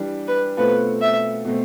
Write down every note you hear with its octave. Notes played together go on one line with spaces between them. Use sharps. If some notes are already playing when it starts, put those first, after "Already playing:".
Already playing: E3 G3 D4
B4
B2 A3 C4 F4 A4 B4
E5
B2 A3 C4